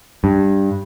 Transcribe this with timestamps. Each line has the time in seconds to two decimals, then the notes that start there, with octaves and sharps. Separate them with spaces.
0.24 G2